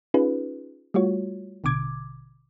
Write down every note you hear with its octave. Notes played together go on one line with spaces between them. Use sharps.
C#4 D#4 F4 G#4 B4
G3 A3 F4 F#4 C#5
A1 B2 D3 D6 G#6